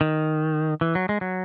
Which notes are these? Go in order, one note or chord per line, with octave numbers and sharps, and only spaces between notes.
D#3
E3
F#3
G#3
F#3